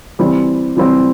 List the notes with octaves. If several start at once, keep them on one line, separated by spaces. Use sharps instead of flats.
E3 G3 C4
E3 G3 C4